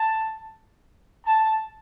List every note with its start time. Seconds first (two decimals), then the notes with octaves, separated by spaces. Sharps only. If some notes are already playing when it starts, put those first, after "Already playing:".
Already playing: A5
1.26 A5